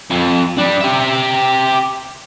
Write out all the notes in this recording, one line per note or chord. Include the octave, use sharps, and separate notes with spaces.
F2
G3 D4
G4 E5